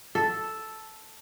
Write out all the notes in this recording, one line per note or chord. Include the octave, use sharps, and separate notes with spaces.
A4